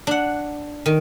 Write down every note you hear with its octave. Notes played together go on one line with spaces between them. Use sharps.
D4 F#5
D#3